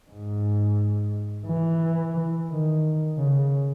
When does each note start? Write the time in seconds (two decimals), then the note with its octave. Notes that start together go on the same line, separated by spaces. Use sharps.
0.11 G#2
1.47 E3
2.51 D#3
3.18 C#3